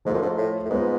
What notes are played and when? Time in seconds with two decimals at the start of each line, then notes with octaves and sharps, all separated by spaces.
0.05 G#2 F3 A3 F4 A4
0.14 F#2
0.22 G#2
0.38 A2
0.65 A2
0.70 G#2 G#3 B3 F4